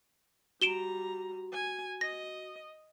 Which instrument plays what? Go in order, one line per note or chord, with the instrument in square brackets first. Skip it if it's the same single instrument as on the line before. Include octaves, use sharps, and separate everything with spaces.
[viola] G3 A#5 [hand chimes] F#4 [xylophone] D7 E7 G7
[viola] G#5
[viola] D#5 [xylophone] A#6